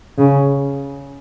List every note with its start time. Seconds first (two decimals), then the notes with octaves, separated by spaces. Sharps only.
0.18 C#3